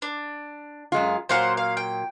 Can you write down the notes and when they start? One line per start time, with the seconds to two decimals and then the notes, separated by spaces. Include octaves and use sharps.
0.02 D4
0.92 F#2 G#3 F4
1.29 A#2 F#3 C5 F5 F#5
1.57 F5
1.77 G5